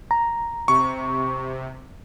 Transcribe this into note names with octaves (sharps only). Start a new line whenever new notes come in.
A#5
C3 C#6